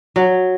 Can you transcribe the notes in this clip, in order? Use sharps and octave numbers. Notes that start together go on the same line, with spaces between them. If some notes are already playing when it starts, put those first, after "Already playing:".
F#3